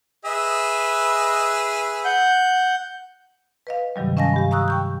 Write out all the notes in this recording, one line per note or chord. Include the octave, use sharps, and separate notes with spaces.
G#4 B4 D#5 E5
F#5 G6
B4 D#5 F5
G2 C3 D#3 F#3 G3
C#4 D#5 F5 G#5 A5 A#6
G2 G4 F5
F5 A#5 C#6 D#6 E6 F#6
G5 C#6 G6